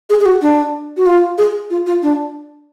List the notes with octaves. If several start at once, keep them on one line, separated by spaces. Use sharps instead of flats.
G#4
G#4
F#4
D4
F#4
F4
G#4
F4
F4
D4